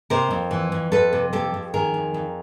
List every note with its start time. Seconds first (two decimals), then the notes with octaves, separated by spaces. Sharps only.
0.10 C3 A#4 C5
0.31 F2
0.51 E3
0.72 F2
0.92 F2 A4 B4
1.13 C3
1.33 F2 G4 A4
1.54 F2
1.74 D#3 G#4 A#4
1.94 F2
2.14 F2